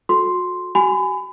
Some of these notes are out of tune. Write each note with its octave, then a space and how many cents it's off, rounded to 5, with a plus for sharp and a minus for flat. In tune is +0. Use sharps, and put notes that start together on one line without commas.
F#4 -35 A4 -10 C6 +0
F#4 +40 G#5 +0 B5 +30